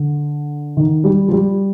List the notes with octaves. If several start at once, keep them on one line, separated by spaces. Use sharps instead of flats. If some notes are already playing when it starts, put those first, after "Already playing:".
Already playing: D3
D#3
G3
F3
G3